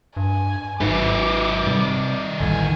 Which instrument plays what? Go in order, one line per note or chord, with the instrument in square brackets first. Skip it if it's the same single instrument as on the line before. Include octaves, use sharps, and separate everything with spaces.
[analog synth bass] G2 [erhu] G#5
[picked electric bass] G#1 F#3 [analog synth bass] G#2 [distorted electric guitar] D#3 B4 [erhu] D6
[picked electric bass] C3 [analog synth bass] G3
[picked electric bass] A1 D#2 E3 [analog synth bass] D3 [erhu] G#5